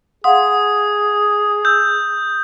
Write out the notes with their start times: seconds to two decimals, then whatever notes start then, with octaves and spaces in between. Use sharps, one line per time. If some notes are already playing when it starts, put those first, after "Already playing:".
0.24 G#4 F5 F#5 C6 D#6
1.65 E6 G6